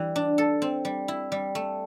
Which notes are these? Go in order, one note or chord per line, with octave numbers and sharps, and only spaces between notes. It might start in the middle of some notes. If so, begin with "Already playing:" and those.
Already playing: E3 G3
D4
A4
C4
G3
E4
G3
A3